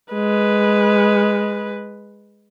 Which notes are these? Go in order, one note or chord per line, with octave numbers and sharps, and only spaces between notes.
G#3 B4